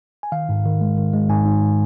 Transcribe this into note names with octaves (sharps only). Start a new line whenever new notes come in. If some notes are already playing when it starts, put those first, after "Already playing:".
G#5
D#3 F5
G#2
D#3
G#3
D#3
G#3
G#2 G#5
G#2